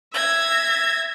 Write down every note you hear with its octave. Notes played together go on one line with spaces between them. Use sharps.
E5 G#6 A#6